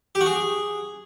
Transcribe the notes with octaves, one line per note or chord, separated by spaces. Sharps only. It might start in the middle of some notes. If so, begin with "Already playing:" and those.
G4
F#4
G#4